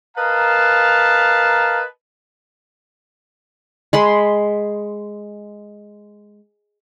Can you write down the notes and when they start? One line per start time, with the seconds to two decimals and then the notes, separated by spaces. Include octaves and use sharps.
0.17 A#4 B4 D#5 F5 A5 A#5
3.93 G#3 B5 C6